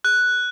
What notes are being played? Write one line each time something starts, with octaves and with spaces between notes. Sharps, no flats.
F#6